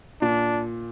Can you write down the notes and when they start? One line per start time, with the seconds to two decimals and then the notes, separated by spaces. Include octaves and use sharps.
0.21 A#2 D4